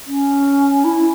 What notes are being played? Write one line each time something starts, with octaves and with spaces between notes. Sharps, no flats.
C#4
E4